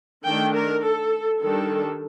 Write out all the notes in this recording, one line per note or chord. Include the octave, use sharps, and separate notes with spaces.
D#3 A3 D4 G5
A#4
A4
D#3 G3 D4 A4